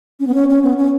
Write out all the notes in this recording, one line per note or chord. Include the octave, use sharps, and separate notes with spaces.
C#4
B3
C#4
C#4
B3
C#4